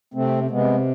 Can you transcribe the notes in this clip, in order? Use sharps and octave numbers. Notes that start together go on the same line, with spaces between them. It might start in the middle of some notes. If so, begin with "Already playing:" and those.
C3 A3 C4
C3 G#3 B3